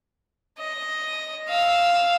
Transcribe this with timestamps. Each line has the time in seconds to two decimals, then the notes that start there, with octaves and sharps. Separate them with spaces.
0.58 D#5
1.48 F5 E6